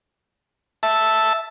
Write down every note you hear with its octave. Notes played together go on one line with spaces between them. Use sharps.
E5 A5